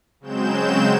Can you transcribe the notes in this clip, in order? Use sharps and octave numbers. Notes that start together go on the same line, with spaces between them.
C#3 F#3 G#3 C4 G6 E7